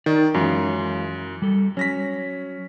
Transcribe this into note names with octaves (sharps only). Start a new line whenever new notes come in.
D#3 D5
F#2 E3 G#3 F4
G3 A4
F#3 C#4 A#6 B6